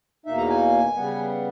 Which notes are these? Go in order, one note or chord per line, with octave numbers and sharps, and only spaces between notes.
E2 B2 A#3 D#4 E5
A#5
G#5
C#3 G3 B3